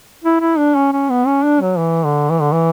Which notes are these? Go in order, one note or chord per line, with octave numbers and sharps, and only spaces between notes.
E4
E4
D4
C#4
C#4
B3
C#4
D4
F#3
E3
D3
E3
D3
E3